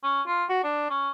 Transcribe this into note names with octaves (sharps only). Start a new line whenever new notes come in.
C#4
F4
F#4
D4
C#4